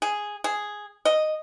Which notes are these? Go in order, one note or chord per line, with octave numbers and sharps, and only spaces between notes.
G#4
G#4
D#5